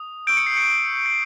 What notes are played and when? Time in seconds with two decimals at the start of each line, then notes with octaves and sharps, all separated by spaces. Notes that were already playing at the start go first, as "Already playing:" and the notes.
Already playing: D#6
0.27 C#6 E6 G6 D7
0.37 C#7
0.46 C7
0.57 C#7
1.06 C7